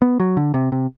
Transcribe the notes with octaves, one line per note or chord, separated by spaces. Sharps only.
B3
F#3
D3
C3
C3